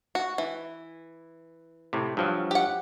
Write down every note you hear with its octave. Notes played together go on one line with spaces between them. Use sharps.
F#4
E3
A2 C3
G2 F3 F#3
G4 F#5